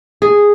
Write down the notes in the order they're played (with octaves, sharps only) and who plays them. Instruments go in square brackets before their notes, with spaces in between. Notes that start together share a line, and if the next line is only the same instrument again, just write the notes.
[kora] G#4